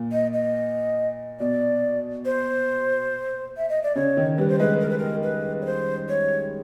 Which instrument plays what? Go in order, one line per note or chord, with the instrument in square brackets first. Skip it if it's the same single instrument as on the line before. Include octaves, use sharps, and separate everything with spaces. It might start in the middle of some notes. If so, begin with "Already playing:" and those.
Already playing: [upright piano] A#2
[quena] D#5
D#5
[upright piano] B2 [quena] D5
[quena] C5
E5
D#5
D5
[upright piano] C#3 [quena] C#5
[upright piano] D#3
[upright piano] G3 [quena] B4
[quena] C5
[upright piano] G#3 [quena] B4
[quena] A#4
B4
A#4
B4
C#5
C5
C#5